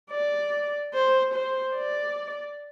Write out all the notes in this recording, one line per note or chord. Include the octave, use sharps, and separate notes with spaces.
D5
C5
C5
D5